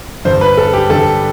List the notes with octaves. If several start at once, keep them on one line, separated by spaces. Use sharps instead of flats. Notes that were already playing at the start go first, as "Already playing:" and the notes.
G2 D3 C5
B4
A4
G4
G2 D3 A4